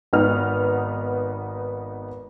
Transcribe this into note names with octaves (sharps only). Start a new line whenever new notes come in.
G#1 B3 D#4 F6